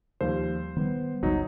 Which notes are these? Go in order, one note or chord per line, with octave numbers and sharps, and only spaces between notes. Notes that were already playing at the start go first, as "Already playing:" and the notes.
D#2 F3 G3 C5
D#3 G3 B3
G#1 D2 F#3 G3 D#4